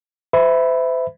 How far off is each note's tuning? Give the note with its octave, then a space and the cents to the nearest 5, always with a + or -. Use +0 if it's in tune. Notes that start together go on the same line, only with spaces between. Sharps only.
C5 -40 E5 +0 B5 +0